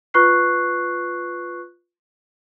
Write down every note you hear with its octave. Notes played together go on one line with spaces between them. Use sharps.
F4 B4 C#6 F#6 C7